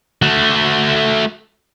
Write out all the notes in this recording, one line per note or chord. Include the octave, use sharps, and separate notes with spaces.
A3 F#4